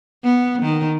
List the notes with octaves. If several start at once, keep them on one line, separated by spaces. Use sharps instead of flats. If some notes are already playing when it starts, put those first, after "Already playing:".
B3
D#3